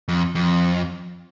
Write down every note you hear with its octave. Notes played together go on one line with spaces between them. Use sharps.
F2
F2